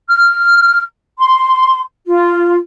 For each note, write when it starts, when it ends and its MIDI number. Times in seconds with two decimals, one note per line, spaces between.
0.08 0.81 89
1.18 1.78 84
2.05 2.56 65